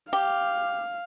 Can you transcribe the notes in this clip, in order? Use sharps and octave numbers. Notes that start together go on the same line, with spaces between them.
G4 F5